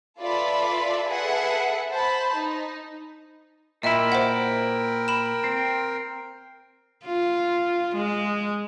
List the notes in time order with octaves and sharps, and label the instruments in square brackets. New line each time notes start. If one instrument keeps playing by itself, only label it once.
[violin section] F4 A4 B4 D5 E5 B5
G#4 A4 B4 E5 F#5
C5 A5 B5
D#4
[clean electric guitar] A#2 E4 [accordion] A#4 G5 [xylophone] D#5 E5
[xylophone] C5 E5 F#5
B5 E7
[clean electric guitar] C4
[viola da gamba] F4
G#3